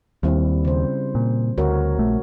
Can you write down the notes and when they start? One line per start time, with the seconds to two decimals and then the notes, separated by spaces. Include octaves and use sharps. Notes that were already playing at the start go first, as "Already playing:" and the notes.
0.23 D#2 G3 C4 E4
0.65 C#3 C5
1.15 A#2
1.58 D2 F#4 A#4 C#5
1.98 A#1 A3